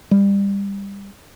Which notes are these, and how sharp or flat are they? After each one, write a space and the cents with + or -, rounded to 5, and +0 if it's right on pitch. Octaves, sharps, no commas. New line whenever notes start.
G3 +25